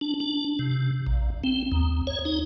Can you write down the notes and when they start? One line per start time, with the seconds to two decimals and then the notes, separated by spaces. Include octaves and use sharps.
0.01 D4
0.20 D4
0.59 C3
1.07 A#1
1.44 C4
1.72 D#2
2.07 C#5
2.25 D#4